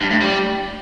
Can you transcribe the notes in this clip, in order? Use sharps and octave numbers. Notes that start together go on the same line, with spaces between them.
G2
A2
G3